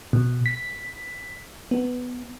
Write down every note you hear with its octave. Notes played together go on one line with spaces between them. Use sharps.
B2
B6
B3